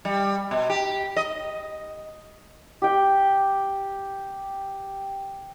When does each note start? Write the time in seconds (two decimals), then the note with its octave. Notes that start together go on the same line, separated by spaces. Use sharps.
0.05 G3
0.51 B2
0.70 G4
1.16 D#5
2.82 G4 G5